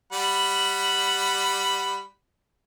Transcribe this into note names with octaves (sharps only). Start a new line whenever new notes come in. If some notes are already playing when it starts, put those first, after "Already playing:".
G3 F#5 B5